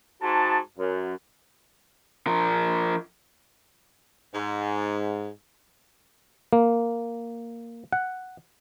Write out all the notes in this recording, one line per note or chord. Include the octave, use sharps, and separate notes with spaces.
G#2 F#4 G#4 A5
F#2
F3 A#4
G#2
A#3
F#5